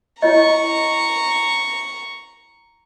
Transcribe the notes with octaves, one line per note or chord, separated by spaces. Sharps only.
E4 C#5 D#5 A#5 C#6